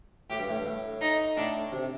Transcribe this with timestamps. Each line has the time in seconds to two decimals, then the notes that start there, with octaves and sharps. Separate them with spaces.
0.30 A2 G4
0.39 G2
0.48 A2
0.57 G2
0.66 A2
1.01 D#4
1.36 A2 D4
1.72 C3